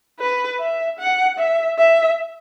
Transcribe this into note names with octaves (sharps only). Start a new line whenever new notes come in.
B4
E5
F#5
E5
E5